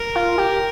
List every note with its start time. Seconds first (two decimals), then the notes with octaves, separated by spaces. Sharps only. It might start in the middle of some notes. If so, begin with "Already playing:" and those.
Already playing: A#4
0.15 F4
0.38 G4